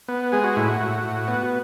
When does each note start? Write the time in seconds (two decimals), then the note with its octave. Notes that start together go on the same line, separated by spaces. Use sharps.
0.08 B3
0.32 G#3 G#4
0.44 F#4
0.56 A2 E4
0.68 F#4
0.80 A2
1.03 A2
1.28 B3